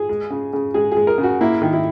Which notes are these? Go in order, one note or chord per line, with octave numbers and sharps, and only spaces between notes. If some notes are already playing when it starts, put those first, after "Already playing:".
Already playing: G#4
G#3
C#3
C#3
G#3 G#4
G#4
G#3
A#4
C#3
F#4
A#3 E4
D#3
E4